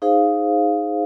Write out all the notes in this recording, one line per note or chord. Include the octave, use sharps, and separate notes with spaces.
D#4 G#4 C5 F5